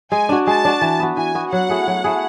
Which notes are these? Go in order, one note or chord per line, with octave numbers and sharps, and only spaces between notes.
G#3 G#5
D4 F#4
G#3 A5
D4 F#4
E3
B3 F#4
E3 G#5
B3 F#4
F#3 F#5
A3 E4 G#4
F#3
A3 E4 G#4